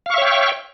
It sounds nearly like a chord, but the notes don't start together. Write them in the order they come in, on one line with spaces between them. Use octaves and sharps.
F5 C#6 E5 C#5 G5